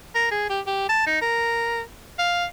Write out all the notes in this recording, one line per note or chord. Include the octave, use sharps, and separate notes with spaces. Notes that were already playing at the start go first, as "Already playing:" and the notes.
A#4
G#4
G4
G4
A5
D#4
A#4
F5